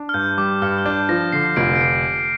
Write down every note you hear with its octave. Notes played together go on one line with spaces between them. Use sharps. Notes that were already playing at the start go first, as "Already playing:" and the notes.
Already playing: D4
F6
G2 G6
G3 D6
G2 F6
F6
D4 G6
F3 A#6
D3 C7
F1 D7
D7
C7